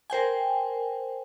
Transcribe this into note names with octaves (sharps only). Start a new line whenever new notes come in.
A#4 C5 G5 G#5